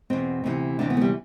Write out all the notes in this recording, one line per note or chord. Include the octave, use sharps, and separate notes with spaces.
E2 B2 C4
D2 C3 E3
D2 C3 E3 D4
B3
A3
G3